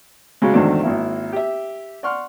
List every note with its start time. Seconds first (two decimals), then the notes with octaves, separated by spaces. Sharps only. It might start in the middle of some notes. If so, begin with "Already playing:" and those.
0.42 A2 C#3 F#3 G#3
0.53 E2 G#2 D#3 F#3 A3 D4
0.83 G#1 A#3 E4
1.33 G4 E5
2.03 D5 F#5 C6 C#6 F6